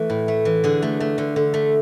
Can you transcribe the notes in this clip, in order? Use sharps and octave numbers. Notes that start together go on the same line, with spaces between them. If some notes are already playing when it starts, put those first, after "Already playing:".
Already playing: E3 A3
A2
A3
E3
D3 G#4
A3
A3
D3
D3
A3